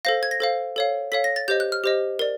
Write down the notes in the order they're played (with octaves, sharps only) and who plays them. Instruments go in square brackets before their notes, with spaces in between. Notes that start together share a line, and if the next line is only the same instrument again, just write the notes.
[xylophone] A4 C5 F5 A#6
G#6
A#6
A4 C5 F5
A4 C#5 F5
A4 C#5 F5 B6
A#6
A6
G4 C5 D#5 G6
F#6
F6
G4 C5 D#5
A#4 D5